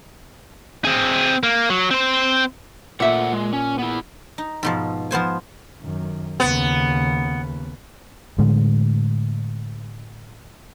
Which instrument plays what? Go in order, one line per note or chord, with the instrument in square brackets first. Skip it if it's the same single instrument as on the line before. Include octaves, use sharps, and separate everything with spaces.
[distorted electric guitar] C4 G#4
A#3
F#3
C4 C5
[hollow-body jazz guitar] A#2 E5 [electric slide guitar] A3 F#5
[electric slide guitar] G#3
C#4
B3 E4
[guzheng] D#4
G#2 B2 F3
F3 B3 C5 G#5
[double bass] F#2 D#3
[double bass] D#2 C#3 [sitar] B3
[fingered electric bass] A2 D3 G#3